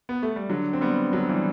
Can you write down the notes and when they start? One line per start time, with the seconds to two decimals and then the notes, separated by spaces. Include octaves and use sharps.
0.09 B3
0.23 A3
0.36 G3
0.50 D3 F#3
0.73 C4
0.81 G3 B3
1.13 D3 F#3
1.29 E3 G3